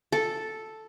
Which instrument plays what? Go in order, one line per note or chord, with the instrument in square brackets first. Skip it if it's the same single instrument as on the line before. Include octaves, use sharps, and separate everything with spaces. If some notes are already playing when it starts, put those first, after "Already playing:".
[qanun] A4